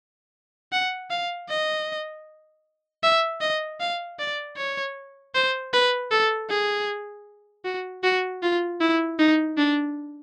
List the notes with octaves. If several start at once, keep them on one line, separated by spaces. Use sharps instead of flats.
F#5
F5
D#5
E5
D#5
F5
D5
C#5
C5
B4
A4
G#4
F#4
F#4
F4
E4
D#4
D4